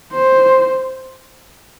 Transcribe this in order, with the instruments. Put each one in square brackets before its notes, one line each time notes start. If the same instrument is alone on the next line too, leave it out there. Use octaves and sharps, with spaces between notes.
[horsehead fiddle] C5